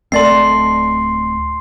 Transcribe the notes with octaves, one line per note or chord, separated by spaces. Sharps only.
D1 A3 C4 A4 D5 D#5 C6 C7